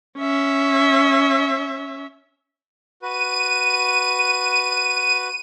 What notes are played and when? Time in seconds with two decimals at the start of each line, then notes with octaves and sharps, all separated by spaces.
0.19 C#4 E5
3.02 F#4 B4 D#7